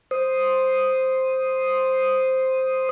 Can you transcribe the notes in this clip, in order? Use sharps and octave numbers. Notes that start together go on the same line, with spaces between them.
C5 D#6